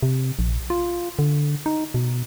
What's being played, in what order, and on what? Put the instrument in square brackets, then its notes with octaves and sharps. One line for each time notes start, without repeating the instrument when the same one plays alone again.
[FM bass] C3
A#1
F4
D3
D#4
B2